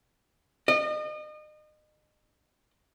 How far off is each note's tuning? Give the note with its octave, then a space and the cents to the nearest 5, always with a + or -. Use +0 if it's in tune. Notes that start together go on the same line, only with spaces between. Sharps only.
D#5 -35